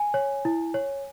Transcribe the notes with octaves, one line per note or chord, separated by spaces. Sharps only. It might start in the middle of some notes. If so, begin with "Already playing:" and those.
Already playing: G#5
C#5
E4
C#5